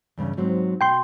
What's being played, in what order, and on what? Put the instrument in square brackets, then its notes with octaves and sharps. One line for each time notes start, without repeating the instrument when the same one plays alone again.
[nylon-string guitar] E2 G2 C#3
G#2 F#3 C4
[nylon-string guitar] B2 [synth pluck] G5 C6 G6